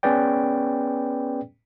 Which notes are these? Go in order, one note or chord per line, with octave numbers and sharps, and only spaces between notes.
B3 C#4 G#4 B4 D5 G5